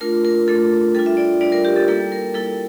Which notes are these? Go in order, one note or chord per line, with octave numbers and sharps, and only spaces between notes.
A3 D4 F4 A#4
A#4
A3 D4 F4 A4
G3 D4 F4 A4
E5
D5
G3 D4 F4 D5
A#4
G4
A4
G3 A#3 E4 A4
A#4
G3 A#3 E4 A4